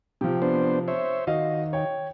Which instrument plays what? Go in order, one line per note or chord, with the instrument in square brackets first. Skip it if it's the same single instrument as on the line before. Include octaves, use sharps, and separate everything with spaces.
[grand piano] C3 F3 [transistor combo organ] G4
[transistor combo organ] B3 D4 C5
C5 C#5 E5
[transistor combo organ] D#3 [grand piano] F#4 D#5 F5
[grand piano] C#5 G5